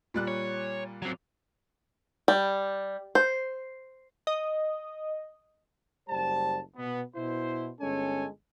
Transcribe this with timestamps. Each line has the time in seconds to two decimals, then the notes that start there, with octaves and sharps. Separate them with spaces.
0.14 A#2 G3 F#6
0.28 C#5
1.02 F#3 C4
2.28 G3
3.15 C5
4.27 D#5
6.09 F#1 G3 C5 A5
6.76 B2 B3
7.16 B2 E4 C5
7.81 G1 G#3 C#4 A4 C#5 G#5